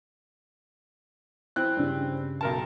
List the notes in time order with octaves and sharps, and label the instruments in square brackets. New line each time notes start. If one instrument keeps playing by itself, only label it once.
[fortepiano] E3 C4 F#6
[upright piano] G2 C#3
[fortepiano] B1 A#4 A5